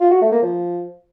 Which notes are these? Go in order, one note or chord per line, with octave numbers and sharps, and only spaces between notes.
F4
F#4
A3
A#3
F3